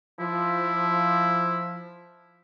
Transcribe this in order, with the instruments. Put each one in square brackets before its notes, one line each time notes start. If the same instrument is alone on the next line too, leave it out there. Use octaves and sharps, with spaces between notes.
[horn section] F3 [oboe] E4